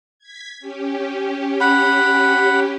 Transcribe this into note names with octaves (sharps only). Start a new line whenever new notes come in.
G#6 B6
C#4 G4
F#5 B5